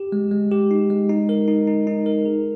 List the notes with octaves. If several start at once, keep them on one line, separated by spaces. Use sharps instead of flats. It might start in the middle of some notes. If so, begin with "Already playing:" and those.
Already playing: G4
G#3
G#3
G4
D#4
G#3
D#4
A#4
D#4
D#4
D#4
A#4
G#4